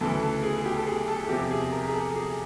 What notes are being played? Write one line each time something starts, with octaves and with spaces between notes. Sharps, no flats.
D2 C#3 E3 A4
A4
G#4
G#4
G4
A4
G#4
A4
E2 C3 F3 G4
G#4
A#4
G#4
A4
G#4